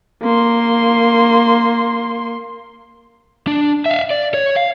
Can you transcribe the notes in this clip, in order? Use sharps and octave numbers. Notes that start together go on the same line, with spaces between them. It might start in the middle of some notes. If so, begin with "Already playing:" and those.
A#3 C6
D4
E5 F5
D5
C#5
F5